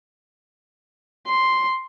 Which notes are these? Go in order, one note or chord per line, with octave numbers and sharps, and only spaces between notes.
C6